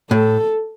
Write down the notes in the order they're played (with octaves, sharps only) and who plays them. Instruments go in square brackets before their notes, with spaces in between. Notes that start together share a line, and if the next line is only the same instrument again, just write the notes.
[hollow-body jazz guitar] A2 [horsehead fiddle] A4